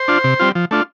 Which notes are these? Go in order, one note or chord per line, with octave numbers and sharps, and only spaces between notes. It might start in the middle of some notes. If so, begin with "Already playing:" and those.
Already playing: C5
D4 F4
C3
G3 C4 F4
F3
A3 D4 F4